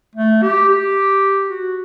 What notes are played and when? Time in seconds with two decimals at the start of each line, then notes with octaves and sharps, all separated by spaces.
0.16 A3
0.42 G4
0.69 G4
1.50 F#4